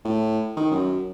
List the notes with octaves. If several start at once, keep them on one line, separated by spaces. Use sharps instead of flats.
A2
D#3
F#2